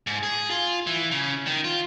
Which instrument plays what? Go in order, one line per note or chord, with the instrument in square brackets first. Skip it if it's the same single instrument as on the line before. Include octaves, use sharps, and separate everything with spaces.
[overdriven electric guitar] G#2
G#4
F4
E3
C#3
D#3
F4